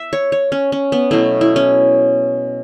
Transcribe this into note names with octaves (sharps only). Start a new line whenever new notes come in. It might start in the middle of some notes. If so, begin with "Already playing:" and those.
Already playing: E5
C#5
C#5
C#4
C#4
B3
B2 F#3 A3 E4
E4
C#4